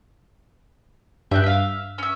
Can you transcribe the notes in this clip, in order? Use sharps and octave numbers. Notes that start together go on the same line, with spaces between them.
G2 E5 G5 F#6
E5 F5
C#4 E5